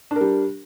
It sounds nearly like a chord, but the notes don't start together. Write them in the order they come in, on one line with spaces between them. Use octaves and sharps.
D4 A#4 G3